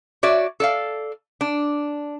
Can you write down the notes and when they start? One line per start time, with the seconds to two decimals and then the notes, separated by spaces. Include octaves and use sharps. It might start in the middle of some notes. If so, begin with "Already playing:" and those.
0.23 F#4 C#5 D5 E5
0.60 A4 D5 F5
1.41 D4